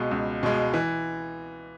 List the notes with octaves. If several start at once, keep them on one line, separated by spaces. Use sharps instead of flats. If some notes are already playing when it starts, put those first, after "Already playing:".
Already playing: C#2 B2 G#3
C#2
B2 G#3
E3